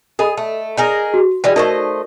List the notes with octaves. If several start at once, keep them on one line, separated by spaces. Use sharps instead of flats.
G#4 A4 D#5 B5
A3
D#4 G#4 A#4
F#4
E3 G3 G#3 C5 D5
A3 D#4 A#4 C5 D5 D#5